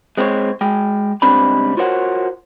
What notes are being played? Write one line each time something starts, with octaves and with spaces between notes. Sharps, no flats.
G#3 C4 C#4 E4 C5 C#5
G#3 G5
C#2 G3 C4 D4 C5 B5
F4 F#4 A#4 C5 C#5 F#5